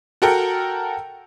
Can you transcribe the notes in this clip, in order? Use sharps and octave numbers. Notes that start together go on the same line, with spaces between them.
F#4 A4 A#4 F#5 G5